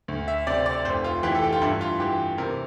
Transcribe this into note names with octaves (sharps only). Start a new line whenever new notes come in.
D2
E5
C3 D5
D5
F1 C5
F4
E3 G4
A4
G4
F4
G2 E4
F4
E3 G4
C3 A#4